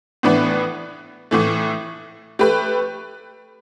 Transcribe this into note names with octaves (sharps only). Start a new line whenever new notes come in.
A2 E3 B3 D4 B4
A2 E3 A3
A3 G4 B4